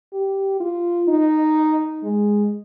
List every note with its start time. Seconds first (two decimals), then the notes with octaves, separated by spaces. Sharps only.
0.12 G4
0.60 F4
1.08 D#4
2.03 G#3